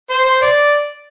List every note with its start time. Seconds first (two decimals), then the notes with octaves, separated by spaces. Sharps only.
0.10 C5
0.25 C5
0.41 D5